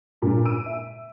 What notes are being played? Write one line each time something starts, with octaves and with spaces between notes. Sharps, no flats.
G2 A#2 C#3
E6 D7 D#7
E5